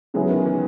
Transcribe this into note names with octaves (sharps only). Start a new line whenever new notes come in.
C#3 F#3 G#3 B3 E4 G#4
D#3
E3